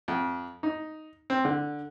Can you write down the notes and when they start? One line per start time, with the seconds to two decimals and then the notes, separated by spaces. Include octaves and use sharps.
0.08 F2
0.63 D#4
1.30 C4
1.45 D3